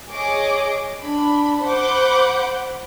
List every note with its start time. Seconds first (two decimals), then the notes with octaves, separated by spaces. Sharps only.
0.11 G#4 C#5 D#5 D6
1.02 D4 B5
1.64 C5 F#5 B5 D6 G6